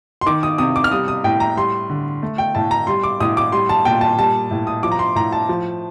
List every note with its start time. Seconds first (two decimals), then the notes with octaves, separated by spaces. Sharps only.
0.21 C6
0.26 D#3 D6
0.43 D#6
0.58 C3 D#6
0.76 D6
0.84 F6
0.92 G3 D#6
1.08 D#6
1.24 A2 G5
1.40 A#5
1.57 G3 C6
1.90 D3
2.23 A3
2.38 G5
2.55 A2 A5
2.71 A#5
2.87 G3 C6
3.03 D6
3.20 A2 D#6
3.37 D6
3.52 G3 C6
3.69 A5
3.85 A#2 G5
4.01 A5
4.18 G3 A5
4.51 A2
4.67 D#6
4.83 F3 D6
4.92 A#5
4.99 C6
5.15 A2 A#5
5.32 A5
5.49 F3